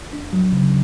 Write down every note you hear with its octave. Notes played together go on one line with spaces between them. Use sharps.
D4
F#3
C#3